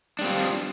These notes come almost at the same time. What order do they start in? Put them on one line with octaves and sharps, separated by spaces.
D4 G3 C4 F4